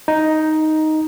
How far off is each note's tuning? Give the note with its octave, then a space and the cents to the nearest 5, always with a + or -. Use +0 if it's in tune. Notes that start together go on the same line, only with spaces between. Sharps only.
D#4 +5